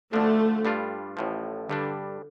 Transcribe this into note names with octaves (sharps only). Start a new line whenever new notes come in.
D2 D3 F3 A3 D4
G2 G3 D4 F4
A1 A2 F3
G2 D3 G3 D4